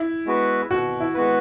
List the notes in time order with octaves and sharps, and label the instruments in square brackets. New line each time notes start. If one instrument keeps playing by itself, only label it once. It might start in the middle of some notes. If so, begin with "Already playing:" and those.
Already playing: [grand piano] E4
[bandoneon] G#3 B3 F#4 B4
[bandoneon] B2 [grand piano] F#4
[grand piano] E4
[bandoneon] G#3 B3 F#4 B4